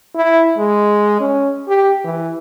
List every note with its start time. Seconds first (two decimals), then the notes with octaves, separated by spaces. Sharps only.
0.15 E4
0.57 G#3
1.20 C#4
1.68 G4
2.04 E3